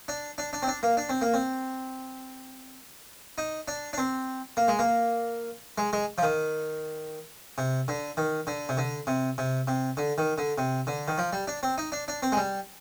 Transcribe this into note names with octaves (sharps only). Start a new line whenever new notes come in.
D4
D4
D4
C4
D4
A#3
D4
C4
A#3
C4
D#4
D4
D4
C4
A#3
G#3
A#3
G#3
G#3
F3
D#3
C3
D3
D#3
D3
C3
D3
C3
C3
C3
D3
D#3
D3
C3
D3
D#3
F3
G3
D4
C4
D#4
D4
D4
C4
G#3
G3